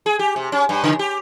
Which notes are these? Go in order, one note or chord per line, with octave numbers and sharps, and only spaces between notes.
G#4
G4
C3
C#4
G2
C#3
G4